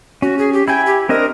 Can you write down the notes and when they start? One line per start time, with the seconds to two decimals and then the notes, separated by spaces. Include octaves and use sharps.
0.22 C#4 F#4
0.39 G#4
0.53 G4
0.68 E4 G5 G#5
0.86 G4
1.09 C4 D4 A#4 D#5